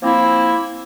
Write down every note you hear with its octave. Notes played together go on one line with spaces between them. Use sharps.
F3 A#3 C4 E4